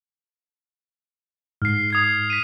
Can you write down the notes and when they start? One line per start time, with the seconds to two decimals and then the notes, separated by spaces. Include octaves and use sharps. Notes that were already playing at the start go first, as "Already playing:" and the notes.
1.62 G#2 F6 C7
1.90 D#6 G#6 C7
2.30 B6 D#7